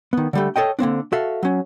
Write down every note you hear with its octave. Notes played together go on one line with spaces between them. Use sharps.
D#3 B3
D3 G3 A3
A4 C#5 D#5 G5
D3 A#3 C4 D4
F#4 A4 E5 F5
F#3 C#4